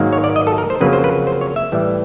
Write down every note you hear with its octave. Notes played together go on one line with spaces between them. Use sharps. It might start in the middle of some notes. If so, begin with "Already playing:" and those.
Already playing: G#2 D#3 F#3 A#3
C#5
D5
D#5
A4
A#4
C5
F2 C#3 F#3 A#3 B4
C5
B4
C5
C#5
E5
A2 E3 G3